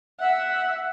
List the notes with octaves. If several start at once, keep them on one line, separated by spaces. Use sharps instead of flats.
E5 F#5